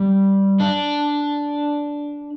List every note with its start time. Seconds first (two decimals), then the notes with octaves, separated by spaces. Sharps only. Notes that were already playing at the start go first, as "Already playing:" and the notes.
Already playing: G3
0.60 D4